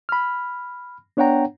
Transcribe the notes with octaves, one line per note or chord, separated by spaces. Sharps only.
B5 F6
B3 D4 C#5 F#5 G5 A#5